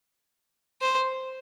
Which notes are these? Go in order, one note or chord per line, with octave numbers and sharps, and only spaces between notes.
C5